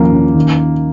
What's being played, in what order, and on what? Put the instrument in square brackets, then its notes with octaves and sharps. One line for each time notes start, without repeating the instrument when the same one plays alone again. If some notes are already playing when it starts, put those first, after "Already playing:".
Already playing: [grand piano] D#2 F3 C#4 [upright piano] A#3
[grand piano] C#4
D#3